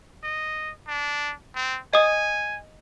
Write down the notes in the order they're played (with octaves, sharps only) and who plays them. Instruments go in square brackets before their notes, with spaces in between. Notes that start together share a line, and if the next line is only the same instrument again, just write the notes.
[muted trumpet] D#5
D4
C4
[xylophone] D#5 D#6 [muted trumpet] G#5